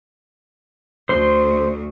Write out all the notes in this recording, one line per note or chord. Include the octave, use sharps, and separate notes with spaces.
D2 C5 C6